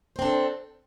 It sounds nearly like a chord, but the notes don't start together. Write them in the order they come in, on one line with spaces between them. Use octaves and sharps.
C5 C4 D4 A4